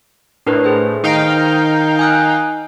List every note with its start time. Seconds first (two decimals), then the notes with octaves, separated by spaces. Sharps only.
0.47 A2 D4 A#4 B4
0.64 G#4 C5
1.04 D#3 D#4 F5 G5
1.99 G#5 D#6 F#6